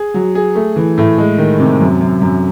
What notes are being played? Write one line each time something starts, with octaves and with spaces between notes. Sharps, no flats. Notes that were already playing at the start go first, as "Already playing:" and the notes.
Already playing: G#4
F#3
G#4
A3
E3
A2
G#3
D#3
C3
F#2
F#2
F#2